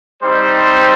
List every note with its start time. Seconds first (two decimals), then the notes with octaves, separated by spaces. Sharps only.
0.22 G3 C4 D#4 C5